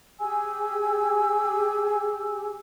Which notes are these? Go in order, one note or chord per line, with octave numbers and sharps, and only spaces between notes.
G4 G#4 G#5 E6